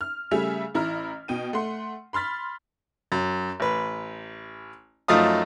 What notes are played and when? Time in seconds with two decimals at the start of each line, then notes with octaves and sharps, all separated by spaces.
0.01 F6
0.31 C#3 G3 A3 E5 G#5 F7
0.74 A1 E4 A#5 F6
1.28 B2 G5 D#7
1.53 A3 F#5 C6
2.13 B5 C6 F6 A6 B6
3.12 F#2
3.60 A1 B4
5.08 F#2 F3 A3 D#4 F5 D#6